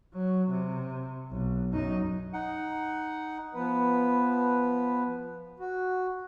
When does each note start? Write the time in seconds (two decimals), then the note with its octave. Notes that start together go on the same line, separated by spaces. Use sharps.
0.14 F#3
0.50 C3
1.31 B1
1.72 F#2 D#4
2.33 D#4 F#5
3.53 F3 B3 B4
5.60 F#4